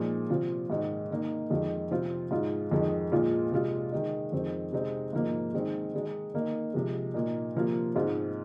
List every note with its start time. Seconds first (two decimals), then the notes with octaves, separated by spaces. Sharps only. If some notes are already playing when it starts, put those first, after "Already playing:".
Already playing: A#2 F3 G#3 D#4
0.30 C3 F3 C4 F4
0.70 G#2 D#3 G#3
1.11 D#3 A#3 D#4
1.50 F2 D#3 G#3 F4
1.91 C3 F3 C4 F4
2.31 G#2 G#3 F4
2.71 F2 D#3 G#3 D#4
3.12 A#2 F3 G#3 F4
3.51 C3 G#3 F4
3.92 D#3 G#3 D#4
4.32 F2 D#3 G#3 C4
4.72 C3 G#3 C4 D#4
5.13 G#2 F3 A#3 D#4
5.54 D#3 G#3 C4 D#4
5.94 D#3 G#3 D#4
6.34 D#3 A#3 D#4
6.74 C3 F3 G#3
7.14 A#2 A#3 D#4
7.55 C3 F3 A#3 F4
7.95 G#2 G#3 C4 F4